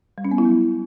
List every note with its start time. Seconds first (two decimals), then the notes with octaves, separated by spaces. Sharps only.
0.18 G3
0.25 C#4
0.31 B3
0.38 E4
0.45 F#3